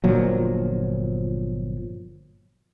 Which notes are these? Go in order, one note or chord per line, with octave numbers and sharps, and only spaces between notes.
G1 A#2 F3 F#3